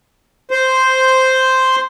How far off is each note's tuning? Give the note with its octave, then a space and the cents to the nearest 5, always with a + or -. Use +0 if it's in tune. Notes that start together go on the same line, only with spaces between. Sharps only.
C5 -5